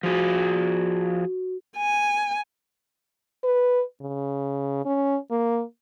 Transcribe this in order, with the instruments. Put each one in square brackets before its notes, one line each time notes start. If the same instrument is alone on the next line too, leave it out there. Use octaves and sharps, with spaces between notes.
[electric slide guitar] F3 G#4 [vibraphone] F#4
[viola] G#5
[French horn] B4
C#3
C#4
A#3